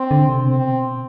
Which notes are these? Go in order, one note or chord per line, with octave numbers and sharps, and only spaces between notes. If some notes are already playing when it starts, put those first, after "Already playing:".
Already playing: C4
D3
C3
B2 C4